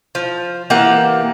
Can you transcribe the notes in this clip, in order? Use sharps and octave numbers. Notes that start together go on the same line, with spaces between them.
F3
E3 A#3 G4 F#5